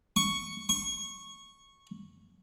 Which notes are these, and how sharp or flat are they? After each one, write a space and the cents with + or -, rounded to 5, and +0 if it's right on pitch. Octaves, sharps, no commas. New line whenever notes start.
C#6 +5
C#6 -10